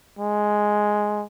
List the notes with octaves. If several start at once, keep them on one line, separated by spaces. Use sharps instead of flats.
G#3